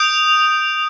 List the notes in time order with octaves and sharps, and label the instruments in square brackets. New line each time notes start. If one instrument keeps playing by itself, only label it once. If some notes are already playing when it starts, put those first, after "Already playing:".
Already playing: [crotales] D#6 G6 D7 F7